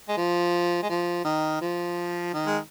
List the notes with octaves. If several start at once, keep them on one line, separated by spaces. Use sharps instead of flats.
G#3
F3
G#3
F3
D#3
F3
D#3
G#3